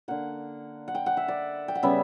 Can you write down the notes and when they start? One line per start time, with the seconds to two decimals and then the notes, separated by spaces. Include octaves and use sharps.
0.08 D3 A#3 F#5
0.88 F#5
0.95 G5
1.06 F#5
1.17 E5
1.28 D5
1.68 G5
1.75 F#5
1.83 C#3 G3 B3 E5